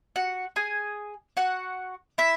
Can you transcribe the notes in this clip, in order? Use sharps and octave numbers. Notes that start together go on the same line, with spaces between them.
F#4 F#5
G#4 G#5
F#4 F#5
E4 E5